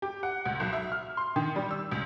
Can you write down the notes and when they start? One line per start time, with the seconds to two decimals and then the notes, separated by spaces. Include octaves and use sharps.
0.02 G4
0.23 F#5
0.46 C#2
0.60 B1
0.73 E5
0.92 F6
1.17 C6
1.36 D#3
1.56 G3
1.71 E6
1.92 C#2